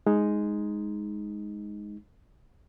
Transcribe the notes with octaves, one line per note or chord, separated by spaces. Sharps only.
G#3 D#4